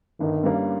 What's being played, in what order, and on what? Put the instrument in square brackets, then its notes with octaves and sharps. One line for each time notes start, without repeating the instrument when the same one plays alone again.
[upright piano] G1 [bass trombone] D#3
[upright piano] G2 G3 A#3 C#4